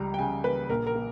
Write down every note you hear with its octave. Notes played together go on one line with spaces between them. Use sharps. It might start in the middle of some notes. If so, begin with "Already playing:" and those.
Already playing: C#2 G3 A#5
G5
C#3 G#5
A#3 B4
A#1 A#4
A#4
A#3